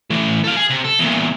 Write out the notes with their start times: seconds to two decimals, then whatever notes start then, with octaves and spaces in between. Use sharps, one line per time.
0.10 E3 A3
0.44 A4 F5
0.56 G#4
0.70 C3
0.84 A4
0.99 E2 A#2